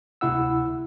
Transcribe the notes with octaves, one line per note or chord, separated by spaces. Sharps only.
D2 C3 E4 F#5 E6